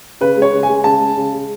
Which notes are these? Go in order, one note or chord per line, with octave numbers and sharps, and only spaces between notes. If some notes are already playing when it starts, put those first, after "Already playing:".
C#3 B4
G#3
C#5
C#3
G#5
G#3
C#3 A5
G#3
C#3
G#3